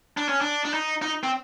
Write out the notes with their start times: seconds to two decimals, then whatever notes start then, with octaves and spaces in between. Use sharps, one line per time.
0.17 D4
0.29 C#4
0.41 D4
0.65 D4
0.74 D#4
1.02 D#4
1.23 C4